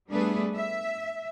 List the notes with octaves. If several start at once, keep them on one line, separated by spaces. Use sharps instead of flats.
G3 A3 B3 D4 G#4 B4
E5